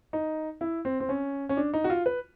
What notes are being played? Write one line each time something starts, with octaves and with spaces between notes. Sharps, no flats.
D#4
E4
C4
C4
C#4
C#4
D4
D#4
F#4
F4
B4